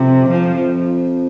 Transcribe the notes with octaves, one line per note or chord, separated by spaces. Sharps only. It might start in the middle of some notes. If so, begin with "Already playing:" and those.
Already playing: F2 C3
F3